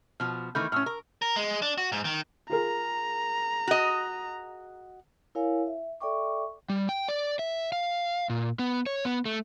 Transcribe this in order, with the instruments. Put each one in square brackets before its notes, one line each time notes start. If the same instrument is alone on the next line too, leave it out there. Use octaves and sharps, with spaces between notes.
[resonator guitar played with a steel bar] B2 F3 [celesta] F6
[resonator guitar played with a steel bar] D#3 E3 A3 [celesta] B5 F6 G6
[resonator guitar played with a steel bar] A2 C#4 [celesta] C#6 E6 F6
[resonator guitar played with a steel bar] A#4
[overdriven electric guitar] A#4
G#3
D4
F#4
G#2
D#3
[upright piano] F4 G#4 A#4 [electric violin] A#5
[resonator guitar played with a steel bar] F#4 D#5
[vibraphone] E4 A#4 C#5 F5 G#5
E5
A4 D5 E5 G5 C#6 D6
[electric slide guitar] G3
G5
D5
E5
F5
A#2
B3
C#5
B3
A3